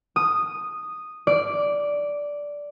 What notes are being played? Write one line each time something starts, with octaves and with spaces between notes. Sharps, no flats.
D#6
D5